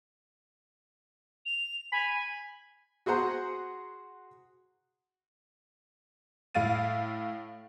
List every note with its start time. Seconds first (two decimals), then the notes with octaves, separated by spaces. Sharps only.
1.46 F7
1.92 G#5 B5
3.06 F#4 G#4 C5 F#5 A#5
6.55 A2 E4 F5 A6 D#7